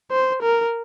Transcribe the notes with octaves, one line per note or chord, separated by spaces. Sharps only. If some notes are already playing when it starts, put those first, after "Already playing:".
C5
A#4